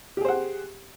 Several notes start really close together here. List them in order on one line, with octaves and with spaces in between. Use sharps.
G4 G#4 C5 F#5